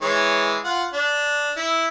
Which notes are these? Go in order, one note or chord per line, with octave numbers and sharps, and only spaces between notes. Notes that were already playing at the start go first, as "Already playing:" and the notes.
E3 G#3 C#5
F4 F#5
D4
E4 E6